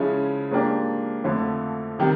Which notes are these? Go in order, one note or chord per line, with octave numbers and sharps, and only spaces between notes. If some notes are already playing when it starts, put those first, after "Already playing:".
Already playing: C#3 F3 G#3 C#4 E4
G#2 F3 A#3 D4 G4
F2 D3 F3 A3
C3 D#3 G3